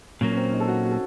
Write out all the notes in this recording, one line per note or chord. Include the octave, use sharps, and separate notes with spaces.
A#2 F#3 A#3 C#4
C#4
C4
D#4
A4
F#4
F#4
A4